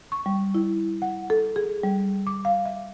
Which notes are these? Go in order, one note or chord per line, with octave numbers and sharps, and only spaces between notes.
C#6
G3
E4
F#5
A4
G#4
G3
D6
F5
E5